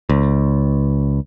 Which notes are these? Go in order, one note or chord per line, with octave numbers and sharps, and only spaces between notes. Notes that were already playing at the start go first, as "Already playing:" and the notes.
C#2